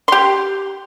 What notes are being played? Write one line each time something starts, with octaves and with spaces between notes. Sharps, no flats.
G4 C6